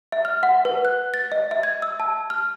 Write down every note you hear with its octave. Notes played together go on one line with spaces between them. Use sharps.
E5
F6
F#5
B4
F#6
A6
D#5
E5
G#6
E6
A5
F6